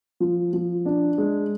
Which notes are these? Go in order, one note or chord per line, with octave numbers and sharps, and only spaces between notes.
F3
F3
D4
G#3